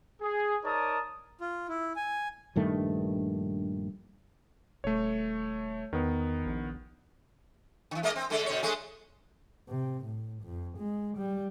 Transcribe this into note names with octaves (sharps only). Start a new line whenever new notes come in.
G#4
D#4 A#4 C#5 D5 A5 D#6
F4
E4
G#5
A#1 G2 D#3 A3
D#1 A3 C#5
E2 D#3 B3
A#1
D3 E3
G#3 A#3 D#5
C4
D3 G#3 A4
B2 D3 C#5
G#3 A3 G#4
C3
A2
F2
G#3
G3